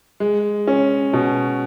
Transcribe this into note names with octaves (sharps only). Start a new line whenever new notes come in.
G#3
C#4
B2